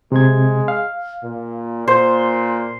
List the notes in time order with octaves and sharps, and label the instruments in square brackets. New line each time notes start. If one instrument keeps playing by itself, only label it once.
[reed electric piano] C3 G#6 [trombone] G#3
[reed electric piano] F5
[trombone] A#2
[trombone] A#2 [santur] C5